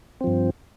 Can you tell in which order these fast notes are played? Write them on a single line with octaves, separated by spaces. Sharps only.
C4 F3 G2